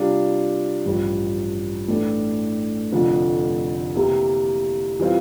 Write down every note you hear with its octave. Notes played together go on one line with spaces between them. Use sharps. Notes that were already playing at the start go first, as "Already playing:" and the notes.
Already playing: C3 G3 D4 F4
A1 G2 F3
A2 E3 A3 D4
F1 F2 D3 F3
C3 E3 A#3 E4 G4
E3 G3 C4 F4